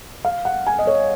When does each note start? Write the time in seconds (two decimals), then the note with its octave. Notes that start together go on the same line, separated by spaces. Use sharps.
0.25 F5
0.45 F#5
0.67 G#5
0.79 D#5
0.87 C#5